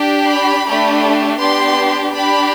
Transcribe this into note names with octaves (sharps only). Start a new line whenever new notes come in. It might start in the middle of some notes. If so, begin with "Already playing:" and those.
Already playing: D4 G4
B5
A3 D4 G4
B3 D4 G4 C6
D4 G4 B5